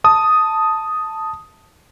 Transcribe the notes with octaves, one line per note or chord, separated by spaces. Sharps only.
A5 D#6